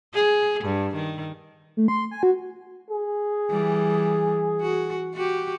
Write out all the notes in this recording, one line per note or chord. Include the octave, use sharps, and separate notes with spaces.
G#4
G2
D#3
A3
C6
G#5
F#4
G#4
E3 G3
F#4
F#4 G4